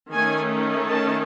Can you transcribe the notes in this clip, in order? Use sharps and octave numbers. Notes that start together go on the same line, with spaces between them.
D#3 A3 C#4 G#5
A5